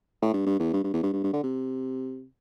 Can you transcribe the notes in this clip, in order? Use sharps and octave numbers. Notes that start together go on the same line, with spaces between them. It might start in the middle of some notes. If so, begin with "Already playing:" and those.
A2
G2
G2
E2
G2
G2
E2
G2
G2
G2
D3
C3